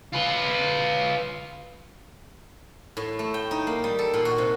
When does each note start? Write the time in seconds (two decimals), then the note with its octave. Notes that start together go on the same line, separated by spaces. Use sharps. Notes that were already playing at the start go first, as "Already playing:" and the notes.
0.13 F4 B4
2.97 A2
3.19 A3
3.34 G5
3.51 D#4
3.67 A#3
3.84 G3
3.99 A4
4.14 A#2
4.25 F#4
4.38 C3